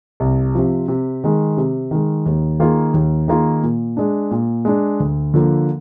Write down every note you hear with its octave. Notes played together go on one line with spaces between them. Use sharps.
C2
C3 F3
C3
D#3 G#3
C3
D#3 G#3
D#2
D#3 A#3 F4 G#4
D#2
D#3 A#3 F4 G#4
A#2
G#3 D4
A#2
G#3 D4
D2
D3 F3 A#3